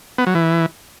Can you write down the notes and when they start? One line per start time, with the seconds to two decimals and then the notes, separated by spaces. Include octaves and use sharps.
0.18 B3
0.27 F#3
0.35 E3